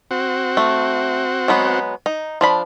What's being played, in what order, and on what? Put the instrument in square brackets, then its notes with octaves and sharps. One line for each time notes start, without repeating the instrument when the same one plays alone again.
[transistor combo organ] C4 F#4
[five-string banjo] A3
F#3 G#3 B3
D#4
F3 D4 B5